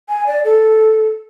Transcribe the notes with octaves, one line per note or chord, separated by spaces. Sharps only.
G#5
D5
A4